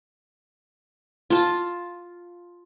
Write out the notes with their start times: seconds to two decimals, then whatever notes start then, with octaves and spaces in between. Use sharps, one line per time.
1.30 F4 A5